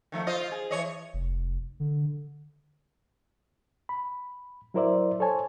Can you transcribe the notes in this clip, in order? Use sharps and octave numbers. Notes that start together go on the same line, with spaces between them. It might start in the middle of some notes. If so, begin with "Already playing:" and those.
D#3 F3 A3
F4 C5 D#5
G#4
E3 C#5 D#5
F1
D3
B5
F#3 E4 A#4 C5 D5 E5
A4 C5 C#5 G#5 A5